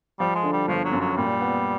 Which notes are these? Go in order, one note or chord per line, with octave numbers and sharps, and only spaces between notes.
F3 G3
G#3
D3
G3
G1 F3
F#3
F#2
F#3
A#2 G3
B3